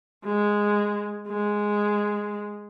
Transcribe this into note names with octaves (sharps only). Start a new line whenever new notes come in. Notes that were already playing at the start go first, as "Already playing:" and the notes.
G#3
G#3